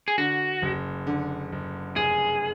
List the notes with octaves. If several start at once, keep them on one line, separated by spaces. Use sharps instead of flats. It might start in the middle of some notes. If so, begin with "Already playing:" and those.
G#4
D3 F#4
F#1
D3
F#1
F1 G#4